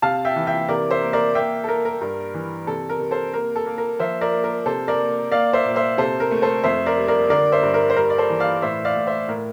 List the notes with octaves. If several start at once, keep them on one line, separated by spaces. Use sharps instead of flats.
C3 F5 A5
E5 G5
E3
E5 G5
C3 A#4 D5
C5 E5
A#3
A#4 D5
A#3 E5 G5
A4
A#3 A#4
A#4
G2
E3
C3 A4
A#4
C3
A4 C5
A#3 A#4
A4
A#3
A#4
F3 C5 E5
A#4 D5
A#3
A#4
C3 A4 C5
A#4 D5
A#3
A#3 D5 F5
C5 E5
A#2
C5 E5
C3 A4 C5
A#4
A3
A4 C5
F2 C5 E5
A#4 D5
G3
A#4 D5
D3 A#4 D5
C5 E5
G2
A#4
C5
G3 A#4
D5
A4 C5
E3
D5 F5
A2 C5 E5
D5 F5
A2
C5 E5
A2 A#4